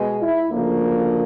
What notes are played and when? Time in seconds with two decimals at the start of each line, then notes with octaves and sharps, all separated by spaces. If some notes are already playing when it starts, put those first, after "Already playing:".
Already playing: B2 G#3
0.21 E4
0.50 D2 C#3 F3 A#3